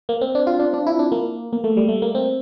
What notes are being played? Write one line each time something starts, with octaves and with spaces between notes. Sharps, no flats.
A#3
C4
D4
F4
D4
D4
E4
D4
A#3
A#3
A3
G3
A3
A#3
C4